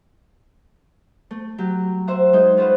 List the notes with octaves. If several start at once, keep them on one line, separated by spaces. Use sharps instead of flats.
A3
F#3 G4
C5 E5 F#5
G#3 D#4
C#4 F4 B4 C5 F#5